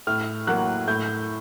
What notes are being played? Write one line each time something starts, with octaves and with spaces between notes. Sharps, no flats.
A2 F6
F#3 A#3 F#6
A2 G6